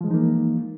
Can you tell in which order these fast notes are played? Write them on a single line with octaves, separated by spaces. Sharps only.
F3 G#3 E3 D#4 A#3